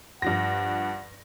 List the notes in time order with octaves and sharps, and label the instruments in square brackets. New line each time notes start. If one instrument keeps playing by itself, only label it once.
[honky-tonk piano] G2 F3 A#6 [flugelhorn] F#5